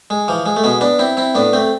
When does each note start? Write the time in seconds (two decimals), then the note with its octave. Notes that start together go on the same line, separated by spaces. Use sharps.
0.10 G#3
0.28 E3 F3
0.46 G#3
0.56 A3
0.64 B2 G#3 B3
0.81 B3 D4
0.99 C4 E4
1.17 C4 E4
1.35 A2 B3 D4
1.53 A3 C4